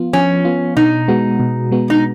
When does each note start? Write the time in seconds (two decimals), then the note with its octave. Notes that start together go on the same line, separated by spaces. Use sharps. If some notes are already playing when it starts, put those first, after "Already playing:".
Already playing: F3 B3 F4
0.13 F3 C#4
0.45 B3 F4
0.76 B2 D#4
1.08 G#3 B3 F#4
1.40 B2
1.71 G#3 B3 F#4
1.90 D#4